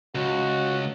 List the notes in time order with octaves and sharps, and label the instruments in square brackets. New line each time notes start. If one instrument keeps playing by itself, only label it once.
[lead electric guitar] C#2 [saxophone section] F#4